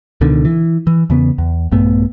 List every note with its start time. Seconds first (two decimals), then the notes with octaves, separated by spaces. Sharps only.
0.21 C#2 B2 D3 D#3
0.45 E3
0.87 E3
1.10 E2 C#3 B3
1.38 E2
1.72 A#1 G2 A3 B3